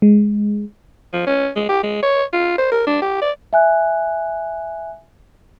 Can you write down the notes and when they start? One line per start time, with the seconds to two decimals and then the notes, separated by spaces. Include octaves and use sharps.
0.02 G#3
1.13 F3
1.27 C#4
1.56 G#3
1.69 G4
1.83 G#3
2.03 C#5
2.33 F4
2.58 C5
2.72 A#4
2.87 D4
3.02 G4
3.22 D5
3.53 E5 G#5 F#6